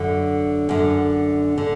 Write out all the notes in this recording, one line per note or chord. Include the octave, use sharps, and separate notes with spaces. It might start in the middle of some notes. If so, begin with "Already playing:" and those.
Already playing: F#2 D3
F#2 D3
D3